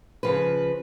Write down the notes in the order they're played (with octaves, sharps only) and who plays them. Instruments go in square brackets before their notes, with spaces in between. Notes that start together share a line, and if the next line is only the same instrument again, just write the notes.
[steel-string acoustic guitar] C#3 F3 B4